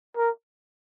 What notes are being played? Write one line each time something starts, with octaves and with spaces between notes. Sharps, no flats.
A#4